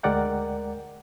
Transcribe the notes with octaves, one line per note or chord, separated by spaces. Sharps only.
D2 G#3 A#4 D5 F#5 G5